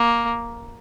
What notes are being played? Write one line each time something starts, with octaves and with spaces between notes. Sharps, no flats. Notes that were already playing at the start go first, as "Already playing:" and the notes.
Already playing: A#3